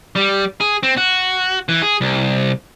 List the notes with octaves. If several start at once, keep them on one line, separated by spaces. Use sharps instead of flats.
G3
G#4
C4
F#4
E3
G#4
C2